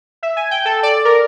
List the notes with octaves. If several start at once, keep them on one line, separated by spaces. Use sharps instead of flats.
E5
G#5
G5
A4
D5
A#4